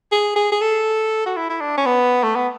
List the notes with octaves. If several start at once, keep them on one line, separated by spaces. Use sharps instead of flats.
G#4
G#4
G#4
A4
F#4
E4
E4
D4
C#4
B3
A3
B3